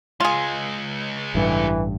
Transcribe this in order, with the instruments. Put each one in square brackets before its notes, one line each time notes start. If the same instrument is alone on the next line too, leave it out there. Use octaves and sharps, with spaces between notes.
[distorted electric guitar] C#2 G#3 [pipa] F4 G#4
[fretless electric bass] A1 G2 [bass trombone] E3